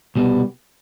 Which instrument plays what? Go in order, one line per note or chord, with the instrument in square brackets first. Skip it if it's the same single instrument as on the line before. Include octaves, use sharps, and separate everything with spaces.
[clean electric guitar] C2 B2 G3 B3